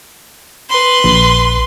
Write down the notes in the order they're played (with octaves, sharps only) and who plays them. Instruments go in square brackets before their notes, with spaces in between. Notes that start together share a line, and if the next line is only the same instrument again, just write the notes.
[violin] B4 C6
[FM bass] A#1